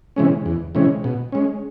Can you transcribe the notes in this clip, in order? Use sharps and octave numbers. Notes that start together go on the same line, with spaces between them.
C3 E3 G#3 C#4
E2
C3 E3 G#3 C#4
B2
G#3 C#4